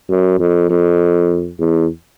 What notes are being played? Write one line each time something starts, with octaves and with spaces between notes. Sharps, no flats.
F#2
F2
F2
E2